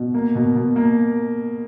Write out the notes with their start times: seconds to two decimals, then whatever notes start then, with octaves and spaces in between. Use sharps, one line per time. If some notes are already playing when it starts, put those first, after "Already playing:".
Already playing: B2
0.14 A#3
0.35 B2
0.56 B2
0.76 A#3